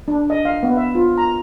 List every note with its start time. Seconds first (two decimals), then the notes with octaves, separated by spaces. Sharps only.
0.08 D4
0.30 D#5
0.45 F5
0.63 B3
0.77 E5
0.95 F4
1.18 A#5